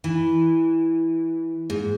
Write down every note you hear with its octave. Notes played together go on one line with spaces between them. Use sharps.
E3
G#2